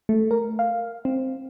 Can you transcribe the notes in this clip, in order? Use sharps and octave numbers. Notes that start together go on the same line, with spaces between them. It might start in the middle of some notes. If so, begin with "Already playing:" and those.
A3
A#4
F5
C4